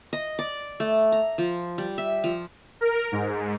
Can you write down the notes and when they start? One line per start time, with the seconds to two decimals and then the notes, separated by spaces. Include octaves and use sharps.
0.13 D#5
0.39 D5
0.80 A3
1.12 A#5
1.38 F3
1.78 G3
1.98 E5
2.24 F3
2.81 A#4
3.12 G#2